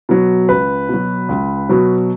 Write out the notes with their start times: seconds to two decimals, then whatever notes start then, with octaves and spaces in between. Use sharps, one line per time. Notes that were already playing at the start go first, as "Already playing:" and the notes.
0.09 B2 F#3
0.49 C#2 B4
0.89 B2 F#3
1.29 C#2
1.69 B2 F#3